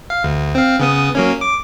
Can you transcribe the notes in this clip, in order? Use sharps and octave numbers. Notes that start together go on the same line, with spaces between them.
F5
D2
C4 F5
C#3 B3 D#6
F#3 A#3 C#4
D6